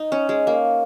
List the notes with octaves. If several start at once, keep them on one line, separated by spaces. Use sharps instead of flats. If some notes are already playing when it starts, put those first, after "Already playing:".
Already playing: D#4
C#4
G#3
A#3